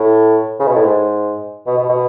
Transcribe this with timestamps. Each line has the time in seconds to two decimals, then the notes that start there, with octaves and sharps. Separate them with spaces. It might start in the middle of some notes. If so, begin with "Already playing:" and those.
Already playing: A2
0.59 C#3
0.67 B2
0.76 A2
0.84 G#2
1.66 B2
1.77 B2
1.89 B2